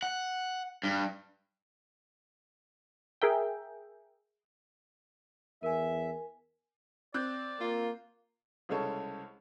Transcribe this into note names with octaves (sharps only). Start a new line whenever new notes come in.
F#5
G2
G#4 A#4 E5 G5
E2 A#4 E5 G#5
C4 D5 F#6 G6
A#3 F4
C2 C#3 G#3 A4 C#5